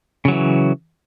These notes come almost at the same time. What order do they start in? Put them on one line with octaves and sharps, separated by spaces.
C#3 F#3 E3